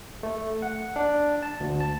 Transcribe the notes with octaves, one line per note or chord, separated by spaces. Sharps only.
A3
F#5
D4
A5
D2
A5